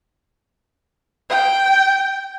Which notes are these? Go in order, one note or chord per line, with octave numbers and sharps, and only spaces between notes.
G5